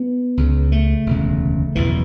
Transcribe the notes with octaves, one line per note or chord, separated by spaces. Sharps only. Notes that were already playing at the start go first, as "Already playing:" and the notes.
Already playing: B3
C#2 C#3
A3
E1 D2 C#3
F#1 E2 B2 E3